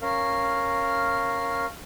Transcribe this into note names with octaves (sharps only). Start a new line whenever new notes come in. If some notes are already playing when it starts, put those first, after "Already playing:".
C#4 A#4 F5